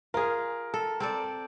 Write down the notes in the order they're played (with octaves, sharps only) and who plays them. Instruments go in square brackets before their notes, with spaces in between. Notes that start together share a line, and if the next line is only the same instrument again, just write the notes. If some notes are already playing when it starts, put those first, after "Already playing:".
[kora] F4 G#4 [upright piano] A#4
[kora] A4
C4 A4 D5